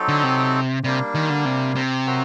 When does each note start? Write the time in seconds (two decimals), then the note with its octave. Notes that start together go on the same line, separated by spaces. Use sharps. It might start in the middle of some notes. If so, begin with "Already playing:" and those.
Already playing: F#3 C4 D#4 A4
0.08 D3
0.24 C3
0.84 C3 G3 A#3 D4
1.15 D#3
1.30 D3
1.45 C3
1.76 C3
2.05 F#3 C4 F#4 A#4